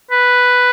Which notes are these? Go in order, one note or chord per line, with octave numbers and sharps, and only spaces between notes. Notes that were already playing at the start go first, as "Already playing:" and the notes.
B4